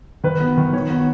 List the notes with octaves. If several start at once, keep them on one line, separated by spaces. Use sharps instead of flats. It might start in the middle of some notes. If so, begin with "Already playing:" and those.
D#3 B4
B3
D#3
D#3 C#5
B3